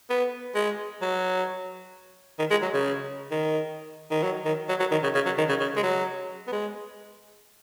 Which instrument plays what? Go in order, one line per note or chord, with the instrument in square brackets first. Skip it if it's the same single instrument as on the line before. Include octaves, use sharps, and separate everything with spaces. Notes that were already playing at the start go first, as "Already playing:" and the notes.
[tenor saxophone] B3
G#3
F#3
D#3
G#3
F#3
C#3
D#3
D#3
F#3
D#3
F#3
F#3
D#3
C#3
C#3
F#3
D#3
C#3
C#3
G#3
F#3
B3
G#3